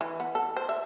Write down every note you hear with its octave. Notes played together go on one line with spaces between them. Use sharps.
E3
B3
A4
C5
E5